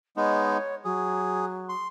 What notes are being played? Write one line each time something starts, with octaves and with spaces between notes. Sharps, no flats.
G#3 B3 D#4 C#5
F#3 G#4
C6